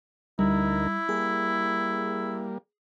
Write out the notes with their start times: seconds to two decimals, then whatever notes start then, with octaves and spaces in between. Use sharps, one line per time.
0.39 D2 G3 D#4 E4 A#4
1.09 G3 A#3 G#4